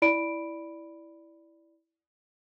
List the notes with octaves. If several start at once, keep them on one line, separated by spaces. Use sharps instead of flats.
E4 D5 B5 D7